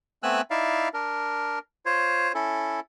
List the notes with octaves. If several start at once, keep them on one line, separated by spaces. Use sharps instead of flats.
A3 B3 C4 G#5 E6 F#6
D#4 E4 D5 E5 F5
D4 A#4
F4 C5 C#5
C#4 E4 A4